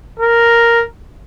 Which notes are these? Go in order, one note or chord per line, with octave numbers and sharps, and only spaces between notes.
A#4